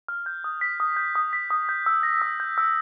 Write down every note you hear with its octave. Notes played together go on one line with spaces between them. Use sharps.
F6
G6
D#6
B6
D#6
G6
D#6
B6
D#6
G6
E6
A#6
E6
G6
E6